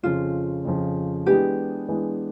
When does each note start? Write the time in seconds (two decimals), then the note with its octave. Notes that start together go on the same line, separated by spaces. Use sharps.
0.03 F2 C#3 F3 F4
0.64 F2 C#3 F3
1.26 E3 G#3 B3 D4 G4
1.88 E3 G#3 B3 D4